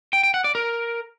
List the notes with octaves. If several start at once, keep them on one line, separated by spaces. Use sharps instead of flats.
G5
G5
F#5
D5
A#4